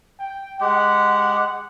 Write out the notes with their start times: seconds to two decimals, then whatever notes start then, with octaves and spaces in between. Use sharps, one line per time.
0.20 G5
0.61 G#3 G4 F#5